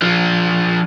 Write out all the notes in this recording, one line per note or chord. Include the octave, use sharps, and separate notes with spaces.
F3 D4